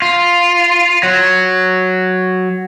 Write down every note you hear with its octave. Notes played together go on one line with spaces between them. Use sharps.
F4
F#3